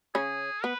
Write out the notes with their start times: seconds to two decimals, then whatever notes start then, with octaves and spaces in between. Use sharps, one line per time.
0.14 C#3 C#4 G#4
0.64 B3 B4